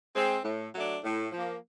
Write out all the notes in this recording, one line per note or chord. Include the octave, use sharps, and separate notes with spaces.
G#3 C4
A2
F#3 A3 D4
A2
F3 A#3